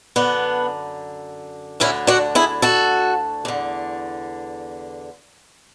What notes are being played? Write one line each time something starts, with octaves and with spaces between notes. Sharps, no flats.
F#2 D3 B3 D4
D2 D3 C#4 E4
D4 F#4
E4 G#4
F#4 A4
E2 D3